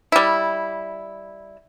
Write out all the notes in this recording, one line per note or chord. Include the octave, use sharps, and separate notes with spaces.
G3 E4